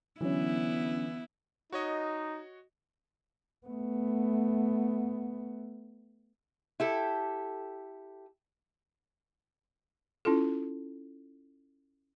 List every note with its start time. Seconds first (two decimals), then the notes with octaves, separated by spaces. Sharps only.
0.21 D3 E3 F#3 B3 C#4 E4
1.72 D#4 F#4 C#5 D#5
3.67 A3 B3
6.80 E4 G4 A4
10.25 C#4 E4 F4 A4